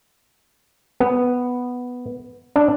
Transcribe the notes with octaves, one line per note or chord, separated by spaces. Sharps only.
B3
D4